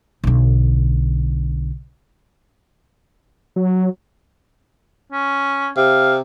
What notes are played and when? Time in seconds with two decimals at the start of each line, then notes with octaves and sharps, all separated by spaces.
0.24 B1 D3
3.56 F#3
5.12 C#4
5.76 C3 F5